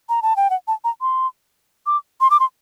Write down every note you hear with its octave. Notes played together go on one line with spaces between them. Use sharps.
A#5
A5
G5
F#5
A5
A#5
C6
D6
C6
D6
C6